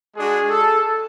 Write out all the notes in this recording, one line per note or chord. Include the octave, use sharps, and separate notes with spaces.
G#3 D4 F#4 G#4
A4